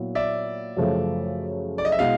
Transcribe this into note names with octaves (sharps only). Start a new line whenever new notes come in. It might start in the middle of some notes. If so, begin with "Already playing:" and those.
Already playing: A#2 F#3 B3 E4
D5 E5
F#2 C#3 F3 A3
D5
D#5
E5
B2 G#3 B3 E4 D#5 F5